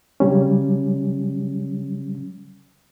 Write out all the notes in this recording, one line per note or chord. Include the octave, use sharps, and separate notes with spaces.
C#3 F#3 G3 C#4